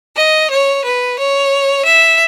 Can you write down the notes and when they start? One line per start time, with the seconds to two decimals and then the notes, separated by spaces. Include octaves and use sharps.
0.16 D#5
0.50 C#5
0.84 B4
1.18 C#5
1.85 E5